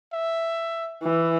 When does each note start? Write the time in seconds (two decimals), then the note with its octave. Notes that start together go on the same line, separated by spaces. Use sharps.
0.13 E5
1.02 E3